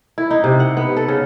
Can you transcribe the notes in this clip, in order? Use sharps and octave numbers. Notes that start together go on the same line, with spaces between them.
E4
D#4
C3
F#5
B3
A4
C#3